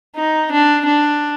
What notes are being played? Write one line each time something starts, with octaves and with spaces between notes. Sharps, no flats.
D#4
D4
D4